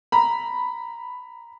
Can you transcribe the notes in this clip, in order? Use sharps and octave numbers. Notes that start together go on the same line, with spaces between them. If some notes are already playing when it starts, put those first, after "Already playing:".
A#5 B5